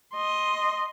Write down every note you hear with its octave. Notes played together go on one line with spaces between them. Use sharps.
D#5 C6